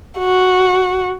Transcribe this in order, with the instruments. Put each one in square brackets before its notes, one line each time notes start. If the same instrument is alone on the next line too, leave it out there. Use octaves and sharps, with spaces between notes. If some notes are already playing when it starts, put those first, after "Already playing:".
[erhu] F#4